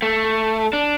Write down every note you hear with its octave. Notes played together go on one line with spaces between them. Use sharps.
A3
D4